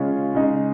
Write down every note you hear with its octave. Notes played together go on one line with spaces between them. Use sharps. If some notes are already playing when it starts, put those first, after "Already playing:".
Already playing: C#3 G#3 C#4 F4
C#3 G#3 D#4